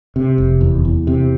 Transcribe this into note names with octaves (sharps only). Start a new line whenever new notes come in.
C3
F1
E2
E2
C3